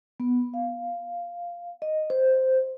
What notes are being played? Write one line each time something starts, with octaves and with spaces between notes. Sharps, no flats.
B3
F5
D#5
C5